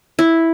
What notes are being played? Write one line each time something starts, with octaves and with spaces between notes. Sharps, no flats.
E4